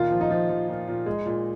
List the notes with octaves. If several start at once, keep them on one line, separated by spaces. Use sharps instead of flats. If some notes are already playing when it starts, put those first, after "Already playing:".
Already playing: A#2 D#3 F4
F3
D#4
F3
F3
A#2
A#2
G#3
A#2